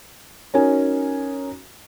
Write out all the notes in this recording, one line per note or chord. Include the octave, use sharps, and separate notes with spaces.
C#4 D#4 F#4 A#4 C#5 G#5